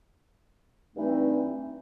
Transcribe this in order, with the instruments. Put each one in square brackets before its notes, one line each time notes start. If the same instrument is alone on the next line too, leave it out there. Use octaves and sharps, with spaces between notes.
[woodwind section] G2 E3 A3 C4 D#4